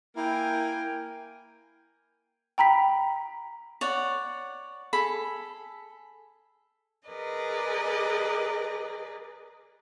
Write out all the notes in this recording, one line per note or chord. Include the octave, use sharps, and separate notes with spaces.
A#3 E4 A#4 G5 G#5
G5 A#5 B5 B6
C#5 D5 F#5
G#4 A4 B5
G#4 A#4 B4 D5 D#5